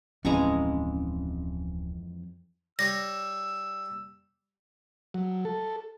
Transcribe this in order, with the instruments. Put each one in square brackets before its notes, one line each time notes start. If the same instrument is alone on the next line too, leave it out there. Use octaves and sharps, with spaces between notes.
[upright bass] D1 [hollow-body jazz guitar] F2 E3 [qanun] G#3 A#5 C#6 [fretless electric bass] C#4
[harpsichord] G3 C#5 [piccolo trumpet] E6 [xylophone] A#6
[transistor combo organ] F#3
A4